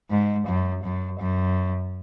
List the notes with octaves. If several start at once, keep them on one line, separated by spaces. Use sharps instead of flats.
G#2
F#2
F#2
F#2